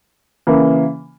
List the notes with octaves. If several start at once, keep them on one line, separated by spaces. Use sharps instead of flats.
C#3 E3 A#3